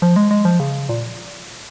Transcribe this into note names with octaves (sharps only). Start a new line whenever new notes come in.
F3
G#3
G#3
F3
C#3
A#2